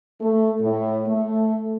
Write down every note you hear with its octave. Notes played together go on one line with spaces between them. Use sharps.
A3
A2
A3